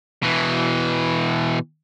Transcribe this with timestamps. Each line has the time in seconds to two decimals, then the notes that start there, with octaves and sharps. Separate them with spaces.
0.23 B2 E3